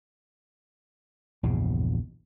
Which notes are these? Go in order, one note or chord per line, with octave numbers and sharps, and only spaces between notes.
A#1 E2 G2 C#3